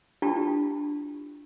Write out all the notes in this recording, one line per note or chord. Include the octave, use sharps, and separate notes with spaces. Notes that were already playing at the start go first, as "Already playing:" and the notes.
D4 E4 F4 G4 A5